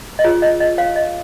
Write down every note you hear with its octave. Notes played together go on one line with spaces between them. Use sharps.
D#5
F4 G#4 C#5
D#5
D#5
C#5 F5
D#5